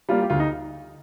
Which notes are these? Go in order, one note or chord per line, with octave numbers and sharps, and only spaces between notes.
G3 A#3 F4
G4
D2 F4
D#4